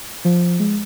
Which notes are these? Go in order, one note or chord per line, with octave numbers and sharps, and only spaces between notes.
F3
G#3